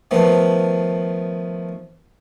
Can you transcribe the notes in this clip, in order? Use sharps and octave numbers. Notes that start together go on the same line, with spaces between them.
D#3 F3 A3 B3